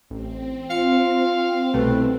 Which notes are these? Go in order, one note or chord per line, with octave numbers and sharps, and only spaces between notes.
A1 C4
F4 F5 F6 C#7
C2 B2 A3 B4